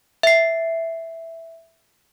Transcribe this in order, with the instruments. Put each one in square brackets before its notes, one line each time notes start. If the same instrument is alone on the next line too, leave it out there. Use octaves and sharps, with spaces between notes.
[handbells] E5 C7